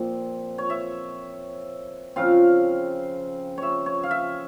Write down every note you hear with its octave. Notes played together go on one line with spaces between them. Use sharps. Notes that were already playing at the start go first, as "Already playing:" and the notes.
Already playing: A#2 F3 C4
C#5
E5
C#3 F3 C4 F5
C#5 E5
C#5
F5
E5